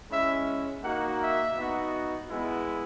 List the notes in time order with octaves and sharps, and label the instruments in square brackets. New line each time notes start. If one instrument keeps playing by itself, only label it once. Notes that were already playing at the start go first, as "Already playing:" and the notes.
[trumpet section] G#3 C#4 E4 E5
A#3 D#4 F#4 F#5
E5
B3 D#4 F#4
G#3 B3 E4